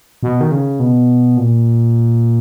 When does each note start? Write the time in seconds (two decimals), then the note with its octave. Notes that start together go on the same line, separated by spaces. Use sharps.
0.23 B2
0.41 D#3
0.51 C#3
0.80 B2
1.37 A#2